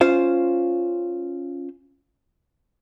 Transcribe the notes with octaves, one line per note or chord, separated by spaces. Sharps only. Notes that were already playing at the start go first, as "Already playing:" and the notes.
C#4 F4 C5 F5